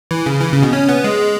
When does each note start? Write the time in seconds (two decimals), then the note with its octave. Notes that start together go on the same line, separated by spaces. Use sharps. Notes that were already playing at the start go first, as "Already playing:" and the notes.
0.11 E3
0.26 C#3
0.41 E3
0.52 C#3
0.62 B2
0.73 C#4
0.89 B3
1.04 G#3